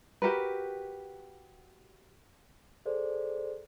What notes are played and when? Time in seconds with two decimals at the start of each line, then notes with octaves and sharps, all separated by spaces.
0.22 F#4 G4 A#4 B4
2.86 G#4 A4 C5 D5